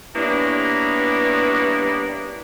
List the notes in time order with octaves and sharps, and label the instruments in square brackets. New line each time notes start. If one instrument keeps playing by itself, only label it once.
[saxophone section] G3 A#3 B3 C#4 D4 E4